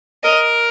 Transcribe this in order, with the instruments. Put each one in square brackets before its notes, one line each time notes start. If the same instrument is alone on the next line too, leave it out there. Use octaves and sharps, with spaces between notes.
[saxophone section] A#4 [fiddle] D#5